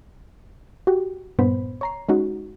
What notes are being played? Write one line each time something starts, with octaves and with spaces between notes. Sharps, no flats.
F#4 G4
G2 A#2 B3 C5 B5
C#5 A#5 C7
G#3 C#4 D#4 F#4